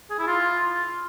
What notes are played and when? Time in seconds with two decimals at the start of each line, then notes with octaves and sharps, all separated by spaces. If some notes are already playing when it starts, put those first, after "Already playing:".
0.11 G#4
0.19 E4
0.27 F4